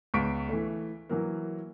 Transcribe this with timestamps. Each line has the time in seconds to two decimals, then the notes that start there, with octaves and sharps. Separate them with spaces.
0.14 C#2 B3 C#6 B6 D7
0.49 E3 A3
1.09 E3 F#3 A#3